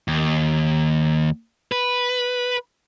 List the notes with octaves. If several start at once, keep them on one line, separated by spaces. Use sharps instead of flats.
D#2
B4